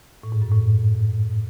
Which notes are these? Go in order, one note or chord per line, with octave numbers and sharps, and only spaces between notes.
A2
G#2
F#2
A2